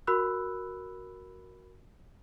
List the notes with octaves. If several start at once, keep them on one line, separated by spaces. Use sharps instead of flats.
F#4 A#4 B5 E6 F#6